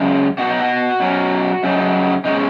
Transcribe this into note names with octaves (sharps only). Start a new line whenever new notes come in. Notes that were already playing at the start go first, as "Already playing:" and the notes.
Already playing: F#2 C#3 G#3
B2 B3 D#4 F#4
D#4
F#4
B2 F#3 C#4
F#2 C#3 F#3 D#4
B2 G#3 C#4 D#4